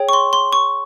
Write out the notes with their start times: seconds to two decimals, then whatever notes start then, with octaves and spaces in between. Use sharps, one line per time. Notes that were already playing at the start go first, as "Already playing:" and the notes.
Already playing: G#4 C#5 G5
0.09 C#6
0.13 C6
0.33 C6
0.53 C#6